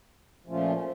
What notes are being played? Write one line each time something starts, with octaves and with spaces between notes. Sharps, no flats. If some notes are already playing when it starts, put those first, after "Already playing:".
A#2 F3 A3 C#4 F4